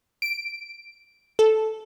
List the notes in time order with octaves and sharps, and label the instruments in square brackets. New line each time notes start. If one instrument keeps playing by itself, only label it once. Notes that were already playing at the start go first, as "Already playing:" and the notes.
[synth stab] D7
A4